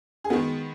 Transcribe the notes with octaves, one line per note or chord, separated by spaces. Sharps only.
G#4
D#3 G#3 B3 F#4